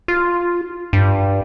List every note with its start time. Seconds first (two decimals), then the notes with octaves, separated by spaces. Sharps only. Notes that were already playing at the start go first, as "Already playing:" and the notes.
0.08 F4
0.93 G2